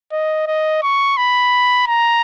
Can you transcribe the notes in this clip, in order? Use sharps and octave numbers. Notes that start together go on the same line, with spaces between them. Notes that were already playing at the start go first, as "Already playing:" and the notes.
D#5
D#5
C#6
B5
A#5